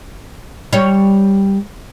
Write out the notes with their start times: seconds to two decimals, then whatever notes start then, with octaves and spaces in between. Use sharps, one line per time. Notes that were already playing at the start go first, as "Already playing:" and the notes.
0.73 G3 C#5